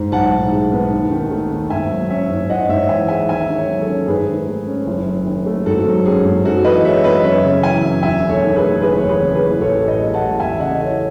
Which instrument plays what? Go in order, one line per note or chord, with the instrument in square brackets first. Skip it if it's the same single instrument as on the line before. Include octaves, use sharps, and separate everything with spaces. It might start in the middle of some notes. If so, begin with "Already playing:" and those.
Already playing: [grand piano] G#2
B1 F#5 A5
A2
G#3
B3
D#2
D#3
A3
D#2
G#2 E5 G#5
F#3
C#4 C#5 E5
G#2
G#1 D#5 F#5
G#2 C#5 E5
E3 E5 G#5
G#3 E5 G#5
D#2 E5 G#5
D#3
C#5 E5
F#3
A4 C#5
C#4
G#2 G#4 B4
D#3
A3
C#4
F#1
F#2
D#3
A3
G#2 F#4 A4
F#3
C#4 G#4
G#2
F#2 F#4 A4
E3 B4 D#5
G#3 C#5 E5
B3 B4 D#5
F#2 C#5 E5
C#3
E3 E5 G#5
F#2
E1 E5 G#5
D#2
A4 C#5
D#3
G#4 B4
A3
F#1 G#4 B4
E2 C#5
G#4 B4
C#3
G#4 B4
E3
A1 A4 C#5
A2
B4 D#5
G#3
F#5 A5
A1
E2 E5 G#5
C#3 D#5 F#5
E3 A4 C#5